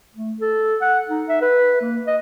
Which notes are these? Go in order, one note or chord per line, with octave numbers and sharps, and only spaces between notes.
A3
A4
F#5
D#4
E5
B4
A#3
D#5